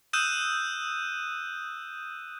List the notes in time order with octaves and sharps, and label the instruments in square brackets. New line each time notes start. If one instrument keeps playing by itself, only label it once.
[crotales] D#6 E6 F#6 G6 D#7 E7